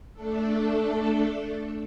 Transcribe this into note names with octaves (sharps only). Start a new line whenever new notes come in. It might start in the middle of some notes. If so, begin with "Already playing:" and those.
A3 D4 A4